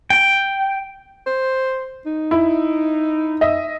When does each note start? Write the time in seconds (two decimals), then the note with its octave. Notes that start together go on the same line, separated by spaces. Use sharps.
0.10 G5
1.26 C5
2.06 D#4
2.31 E4
3.41 D#5 E5